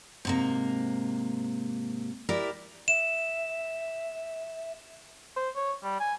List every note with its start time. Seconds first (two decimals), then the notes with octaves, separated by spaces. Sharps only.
0.25 G#2 C3 A#3
2.29 E4 G4 A#4 D5
2.88 E5 E7
5.37 C5
5.56 C#5
5.84 G3
6.00 G#5